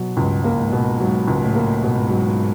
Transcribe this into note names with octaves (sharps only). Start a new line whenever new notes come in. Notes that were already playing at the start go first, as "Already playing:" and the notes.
Already playing: B2 F#3
C#2 G2
A#3
G#2
B2
G#2 F#3
C#2
A2
A#3
G#2 B2
F#3